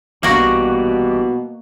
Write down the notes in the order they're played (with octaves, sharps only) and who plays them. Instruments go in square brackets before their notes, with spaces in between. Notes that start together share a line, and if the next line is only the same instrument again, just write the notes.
[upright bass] A#1 D4 [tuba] B2 [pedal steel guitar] E3 G3 D5 [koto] A#3 F#4